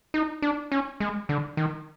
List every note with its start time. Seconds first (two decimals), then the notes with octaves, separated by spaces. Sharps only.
0.14 D#4
0.42 D4
0.72 C#4
1.00 G#3
1.29 D3
1.57 D#3